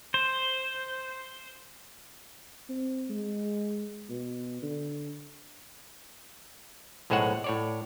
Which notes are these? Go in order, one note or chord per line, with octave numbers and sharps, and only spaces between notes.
C5
C4
G#3
B2
D3
B1 A2 G#3 C5 C#5 F#5
A2 C#5 D5